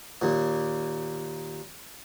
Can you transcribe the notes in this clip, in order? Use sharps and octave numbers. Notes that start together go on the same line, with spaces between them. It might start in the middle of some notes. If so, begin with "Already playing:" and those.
D#2 A#2